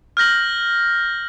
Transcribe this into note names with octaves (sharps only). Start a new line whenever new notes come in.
F6 G6 A#6 F#7